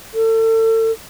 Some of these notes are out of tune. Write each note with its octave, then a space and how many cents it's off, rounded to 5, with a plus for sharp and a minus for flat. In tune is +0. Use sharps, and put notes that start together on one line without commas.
A4 +35